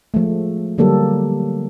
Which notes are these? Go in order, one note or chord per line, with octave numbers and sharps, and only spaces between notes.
F3 G#3 A3
D3 F#3 G3 A#3 G4 A4